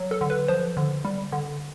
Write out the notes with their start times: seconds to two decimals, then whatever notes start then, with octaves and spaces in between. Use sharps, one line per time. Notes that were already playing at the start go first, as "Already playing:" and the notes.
Already playing: F#3
0.11 A4
0.21 D3
0.30 B4
0.48 F3 C5
0.77 D3
1.05 G3
1.32 D3